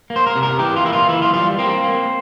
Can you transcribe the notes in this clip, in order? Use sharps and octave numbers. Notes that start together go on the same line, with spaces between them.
A#3
C5
A#4
C3
A#4
E3 G4
F4
A#3 E4
F4
E3 E4
F4
G3 F4
A#3 C4
A#3